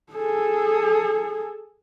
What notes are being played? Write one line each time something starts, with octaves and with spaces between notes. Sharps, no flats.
G#4 A4